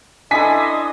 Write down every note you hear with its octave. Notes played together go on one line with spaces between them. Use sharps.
D4 E4 A4 D#5 G#5 C6 D#6 B6